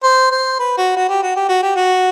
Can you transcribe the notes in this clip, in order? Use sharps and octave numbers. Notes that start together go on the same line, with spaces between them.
C5
C5
B4
F#4
F#4
G4
F#4
G4
F#4
G4
F#4